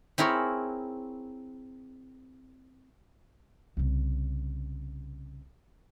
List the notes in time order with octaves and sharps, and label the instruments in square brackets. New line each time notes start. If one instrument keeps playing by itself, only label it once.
[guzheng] C4 E4 G#4 A#4 C#5
[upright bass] C2 C#3